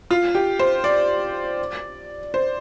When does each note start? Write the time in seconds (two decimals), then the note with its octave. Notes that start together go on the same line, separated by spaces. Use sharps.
0.11 F4
0.35 G4
0.59 C5
0.84 D5
2.34 C5